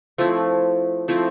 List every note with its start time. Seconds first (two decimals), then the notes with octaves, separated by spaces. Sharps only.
0.18 F3 A3 C4 E4
1.08 F3 A3 C4 E4